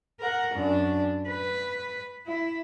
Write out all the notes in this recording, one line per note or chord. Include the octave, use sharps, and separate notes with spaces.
A#4 F#5
F#2 D4
B4
E4